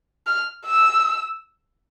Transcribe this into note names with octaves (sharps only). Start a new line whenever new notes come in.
F6
E6